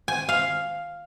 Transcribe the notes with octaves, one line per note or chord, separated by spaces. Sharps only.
G#5
F5